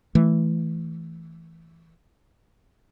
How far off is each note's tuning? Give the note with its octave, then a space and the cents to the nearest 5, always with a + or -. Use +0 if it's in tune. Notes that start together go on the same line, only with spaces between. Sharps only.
E3 +0 A3 +0